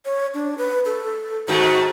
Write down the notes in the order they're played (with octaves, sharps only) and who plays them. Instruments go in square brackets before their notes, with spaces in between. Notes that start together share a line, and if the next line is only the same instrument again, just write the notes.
[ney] C#5
D4
B4
A4
[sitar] G#2 D#3 A3 [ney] F#4